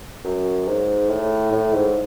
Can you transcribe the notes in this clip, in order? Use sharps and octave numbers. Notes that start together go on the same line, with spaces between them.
F#2
G#2
A2
A2
G#2